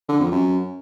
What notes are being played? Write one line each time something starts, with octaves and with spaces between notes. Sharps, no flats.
D3
F2
F#2